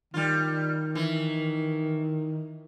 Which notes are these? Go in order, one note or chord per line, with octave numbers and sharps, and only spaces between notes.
D#3 G3 F4
E3